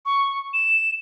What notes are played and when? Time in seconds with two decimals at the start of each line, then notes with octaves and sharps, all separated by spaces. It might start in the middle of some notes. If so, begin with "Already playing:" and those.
0.05 C#6
0.53 E7